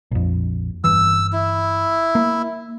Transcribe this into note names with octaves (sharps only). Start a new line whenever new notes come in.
A#1 F2
G1 E3 E6
E4
A#3